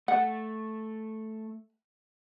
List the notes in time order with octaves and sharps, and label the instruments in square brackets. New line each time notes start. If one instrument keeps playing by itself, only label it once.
[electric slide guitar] A3 [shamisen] F#5